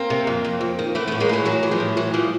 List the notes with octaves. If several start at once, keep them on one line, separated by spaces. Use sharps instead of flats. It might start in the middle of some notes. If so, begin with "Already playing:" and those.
Already playing: A#3 C4
C3
F2
F2
F2
D#3
E3 A3 B3
A2 A3 B3
G#3 A#3
E3 G3 A3
A2 F#3 G#3
E3
F3 G3
A2
E3 F#3
E3 F3 G3